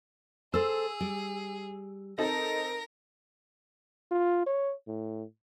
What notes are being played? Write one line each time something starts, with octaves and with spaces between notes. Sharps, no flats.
G#4 A4 C5 E6
G3
C4 D#4 A4 A#4 A#6
F4
C#5
A2